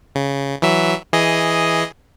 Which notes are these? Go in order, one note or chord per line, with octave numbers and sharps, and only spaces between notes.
C#3
E3 F#3 E5
E3 G#4 D#5